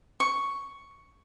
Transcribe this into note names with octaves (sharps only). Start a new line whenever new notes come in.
C#6